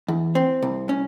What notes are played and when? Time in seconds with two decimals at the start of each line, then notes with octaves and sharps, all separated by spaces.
0.08 E2
0.35 C4
0.62 C2
0.89 C#4